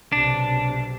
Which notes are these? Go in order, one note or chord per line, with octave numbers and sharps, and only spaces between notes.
B1 C3 D4